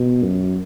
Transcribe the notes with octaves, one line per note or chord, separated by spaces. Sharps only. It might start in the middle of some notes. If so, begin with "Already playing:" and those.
Already playing: B2
F#2